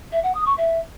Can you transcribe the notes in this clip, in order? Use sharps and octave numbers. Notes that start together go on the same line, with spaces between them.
E5
F#5
D#6
C#6
E5